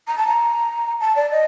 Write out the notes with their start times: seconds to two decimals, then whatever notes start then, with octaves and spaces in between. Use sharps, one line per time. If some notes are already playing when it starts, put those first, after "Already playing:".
0.08 A#5
0.18 A5
0.28 A#5
1.00 A5
1.16 D5
1.31 D#5